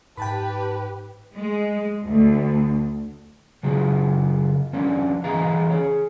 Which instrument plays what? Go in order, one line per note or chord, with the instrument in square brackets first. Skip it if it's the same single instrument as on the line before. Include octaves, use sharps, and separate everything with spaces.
[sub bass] G#2 [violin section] G4 B4 [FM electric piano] G5 A5 B5
[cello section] G#3
D2
[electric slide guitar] C#3 F#3 F4 G#4
F3 C#4 D4
E3 G#4 C5 D#5 F5 A#5
G#4 C#5